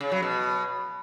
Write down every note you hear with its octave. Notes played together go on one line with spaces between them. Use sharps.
C#3
F#3
B2